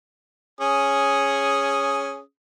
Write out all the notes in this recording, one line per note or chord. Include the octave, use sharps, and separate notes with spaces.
C#4 G#4 D#6